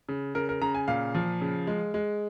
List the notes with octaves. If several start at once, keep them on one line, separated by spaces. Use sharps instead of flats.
C#3
C#3 A#4
A#4
C#3 A#5
G#5
A#2 F5
F3
C#3
G#3
G#3